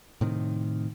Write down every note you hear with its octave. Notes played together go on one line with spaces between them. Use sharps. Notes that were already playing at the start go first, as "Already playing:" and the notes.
A2 C3 D#3